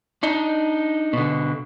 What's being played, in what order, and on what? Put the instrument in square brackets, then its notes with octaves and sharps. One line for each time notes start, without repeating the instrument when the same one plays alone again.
[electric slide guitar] D4 D#4
B2 D3